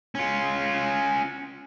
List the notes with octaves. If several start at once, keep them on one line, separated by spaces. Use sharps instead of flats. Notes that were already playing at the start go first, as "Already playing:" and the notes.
C#4 F4